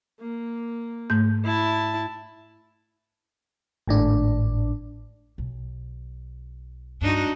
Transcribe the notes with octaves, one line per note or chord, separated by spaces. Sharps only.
A#3
G#2 A3 G6
E4 A5
G#1 A2 D4
B1
G2 G#3 D4 D#4 F#4